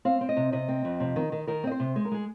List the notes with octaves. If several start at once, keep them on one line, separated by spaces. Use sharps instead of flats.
C4 F5
C4
D#5
C3
C3 D#5
C4
F2
C3
D#3
D#3
D#3 A#4
C4 D#5
C5
C3
G#3 C5
A#4
G#3 G#4